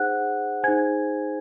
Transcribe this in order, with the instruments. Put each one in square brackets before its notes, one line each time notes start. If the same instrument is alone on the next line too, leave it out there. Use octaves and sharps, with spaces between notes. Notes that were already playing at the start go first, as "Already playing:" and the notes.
Already playing: [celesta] D#4 G#4 C5 F#5 F#6
D#4 G#4 C5 G#5 G#6